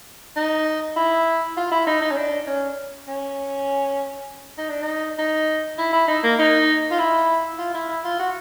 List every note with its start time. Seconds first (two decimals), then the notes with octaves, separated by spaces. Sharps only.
0.36 D#4
0.96 E4
1.57 F4
1.72 E4
1.87 D#4
2.01 D#4
2.11 C#4
2.17 D4
2.47 C#4
3.08 C#4
4.58 D#4
4.70 D4
4.82 D#4
5.19 D#4
5.78 E4
5.93 E4
6.08 D#4
6.23 A#3
6.39 D#4
6.91 F4
6.99 E4
7.59 F4
7.74 E4
7.89 E4
8.05 F4
8.19 F#4